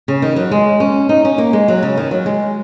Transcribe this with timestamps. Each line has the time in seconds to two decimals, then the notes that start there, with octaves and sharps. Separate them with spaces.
0.08 C#3
0.22 D#3
0.36 F#3
0.51 G#3
0.80 C#4
1.09 D#4
1.25 C#4
1.38 A#3
1.53 G#3
1.68 F#3
1.83 C#3
1.97 D#3
2.11 F#3
2.26 G#3